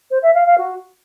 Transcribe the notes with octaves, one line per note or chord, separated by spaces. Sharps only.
C5
E5
F5
F5
F#4